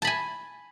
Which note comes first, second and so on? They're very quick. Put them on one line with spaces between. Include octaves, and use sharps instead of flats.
A5 B5 G#5